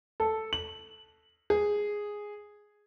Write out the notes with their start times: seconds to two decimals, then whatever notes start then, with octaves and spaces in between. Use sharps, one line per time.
0.20 A4
0.53 F#7
1.50 G#4